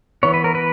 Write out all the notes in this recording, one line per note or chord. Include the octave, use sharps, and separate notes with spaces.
E3 B3 C#5
B4
A#4
B4